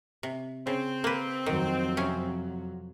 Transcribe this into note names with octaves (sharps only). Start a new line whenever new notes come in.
C3
C#3 C4
A#3 B4
F2 D#3 F#3
C3 C#4